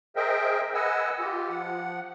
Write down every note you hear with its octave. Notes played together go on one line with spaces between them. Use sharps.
G#4 A#4 C5 D#5 E5 G5
B4 D#5 F#5 G#5 E6
F4 G4
F3 F#5